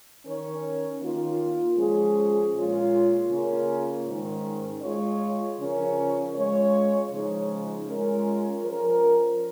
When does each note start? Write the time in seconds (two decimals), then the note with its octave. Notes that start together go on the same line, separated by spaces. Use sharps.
0.26 D#3 C#4 A#4 C#5
1.01 D#3 A#3 F4
1.77 F3 G#3 C#4 G#4
2.54 A#2 G#3 F4 C#5
3.30 C#3 A#3 C#4 F4 A#4
4.06 G#2 D#3 C#4
4.82 G#3 F4 C#5
5.58 C#3 F3 C#4 A#4
6.35 G#3 F4 C#5
7.10 C#3 F3 G#3 D#4 C#5
7.86 G#3 C#4 F4 A#4 C#5
8.63 F3 C#4 A#4